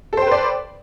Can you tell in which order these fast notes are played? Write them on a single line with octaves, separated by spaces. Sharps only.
A4 C5 G5 B4 D5